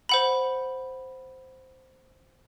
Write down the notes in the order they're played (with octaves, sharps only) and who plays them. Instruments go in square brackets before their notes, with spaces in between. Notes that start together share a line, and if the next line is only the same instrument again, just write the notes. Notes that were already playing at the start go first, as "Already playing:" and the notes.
[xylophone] C5 F#5 B5